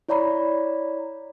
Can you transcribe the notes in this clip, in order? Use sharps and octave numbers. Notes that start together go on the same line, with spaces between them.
E4 C#5 D5 A#5 B5